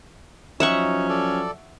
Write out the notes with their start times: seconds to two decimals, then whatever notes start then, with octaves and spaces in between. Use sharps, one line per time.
0.60 F3 F#3 C#4 D#4 E5 F#5 C#6
1.09 A4 D5